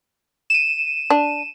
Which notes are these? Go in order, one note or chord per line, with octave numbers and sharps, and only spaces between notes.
D#7 E7
D4